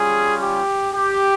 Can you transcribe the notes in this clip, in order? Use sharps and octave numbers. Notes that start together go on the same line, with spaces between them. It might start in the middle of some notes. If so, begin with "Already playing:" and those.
Already playing: G3 C#4 F4 G#4
G4
G4